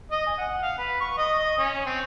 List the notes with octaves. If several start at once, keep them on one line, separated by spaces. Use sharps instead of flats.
D#5
G#5
F#5
F5
B4
C#6
D#5
D#5
C#4
C4